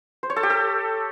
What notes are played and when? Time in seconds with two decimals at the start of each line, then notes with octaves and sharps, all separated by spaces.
0.23 C5
0.30 C#5
0.36 A4
0.43 G4
0.50 A4